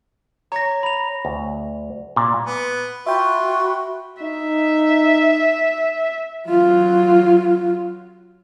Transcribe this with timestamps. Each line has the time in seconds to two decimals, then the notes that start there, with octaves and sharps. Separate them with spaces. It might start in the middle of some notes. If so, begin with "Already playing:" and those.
0.52 C#5 A#5 A#6
0.83 B5 F7
1.25 D2
2.16 A#2
2.47 B3
3.06 F4 F#4 E5 G5 B5 C#6
4.22 D#4 E5
6.49 F#3 F4